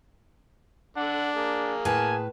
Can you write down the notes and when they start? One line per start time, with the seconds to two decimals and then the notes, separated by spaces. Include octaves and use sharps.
0.97 D3 D4 F#5
1.35 A#3 G#4
1.85 A2 B4 G#5 A5